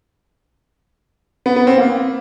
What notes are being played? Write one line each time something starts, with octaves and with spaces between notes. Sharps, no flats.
B3
B3
C4
A#3